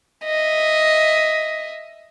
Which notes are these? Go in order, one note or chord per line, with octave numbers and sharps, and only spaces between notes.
D#5 E5